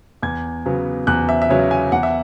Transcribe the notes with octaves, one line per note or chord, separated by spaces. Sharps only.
E2 G#6
C#3 F#3 B3
E2 F#6
E5
E5
C#3 F#3 B3 C#5
G#5
E2 F#5
E5